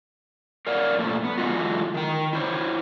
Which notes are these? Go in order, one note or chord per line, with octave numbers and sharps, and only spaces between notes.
A#4 C#5 D5 F5 F#5
A#2 F3 A3
B3
D3 E3 G#3 F4 F#4
D#3 G5
E4 C5 C#5